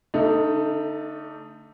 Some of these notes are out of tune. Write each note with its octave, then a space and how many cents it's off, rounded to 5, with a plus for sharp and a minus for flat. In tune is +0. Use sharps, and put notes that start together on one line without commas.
D3 -25 A3 +20 D#4 +0